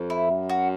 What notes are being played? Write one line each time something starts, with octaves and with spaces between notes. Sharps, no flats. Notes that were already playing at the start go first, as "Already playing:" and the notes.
Already playing: F2
E4
F#2
F#4